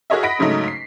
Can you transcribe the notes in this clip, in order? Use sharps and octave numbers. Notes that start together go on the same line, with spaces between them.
F#4 G#4 A#4 C#5 D#5 E5
D#5 F#5 B5 A#6 B6 D7
G#2 C#3 F#3 A3 D#4
B6 C7